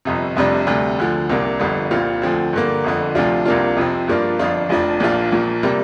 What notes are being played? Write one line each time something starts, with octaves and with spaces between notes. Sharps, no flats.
G1 F2 C3
F1 F2 C3 G3 D4
D2 C3 G3
D2 D3 F3
C2 C3 A#3 D4
G1 F2 D3 G3
C2 A#2 G3 C4 F4
D2 D3 F3 C4
G2 D3 A#3
G1 F2 D3
D2 C3 F3 D4 F4
C2 C3 A#3 D4 F4
F2 C3 F3 C4
G2 F3 A#3 D4 F4
G1 F2 F3 D4 F4
F1 F2 F3 D4
A#1 A#2 F3 D4 F4
A#1 A#2 F3
C3 G3 A#3